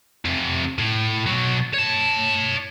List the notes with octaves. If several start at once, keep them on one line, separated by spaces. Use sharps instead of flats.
F2 C3
A2
B2 F#3
C#5 A5